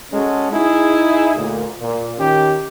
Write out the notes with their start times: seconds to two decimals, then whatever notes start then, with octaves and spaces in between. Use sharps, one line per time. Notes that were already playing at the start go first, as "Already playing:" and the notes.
0.12 G#3 C#4 F#4 A4
0.51 D#4 E4 G#4
1.36 D2 A#2
1.80 A#2
2.18 D#3 C#4 G4